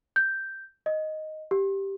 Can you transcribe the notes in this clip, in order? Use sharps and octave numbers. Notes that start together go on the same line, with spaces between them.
G6
D#5
G4